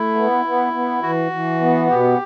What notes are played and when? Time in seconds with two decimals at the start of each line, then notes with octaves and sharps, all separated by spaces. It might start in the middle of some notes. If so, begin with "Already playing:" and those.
Already playing: A3 E4
0.16 B3
0.45 B3
0.73 B3
1.03 E3 F#4
1.32 E3
1.61 B3
1.90 B2 G4